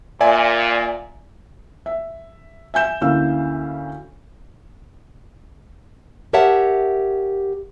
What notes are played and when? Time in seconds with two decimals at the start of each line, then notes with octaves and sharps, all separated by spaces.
0.21 A#2 D5 E5 G#5
1.86 E5
2.74 E5 G#5 G6 E7
3.01 D2 A#3 C#4 E4 F5 E6
6.33 G4 A#4 C#5 E5 F#5 A5